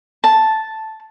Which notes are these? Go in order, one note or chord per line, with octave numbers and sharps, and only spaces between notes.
A5